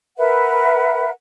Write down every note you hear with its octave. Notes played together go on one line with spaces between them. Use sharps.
A#4 B4 E5 F#5